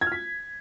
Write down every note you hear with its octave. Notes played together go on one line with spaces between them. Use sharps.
G#6
F6
B6